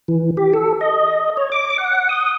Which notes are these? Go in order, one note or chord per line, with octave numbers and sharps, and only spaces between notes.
E3
G4
A4
D#5
C#5
D6
F#5
D#6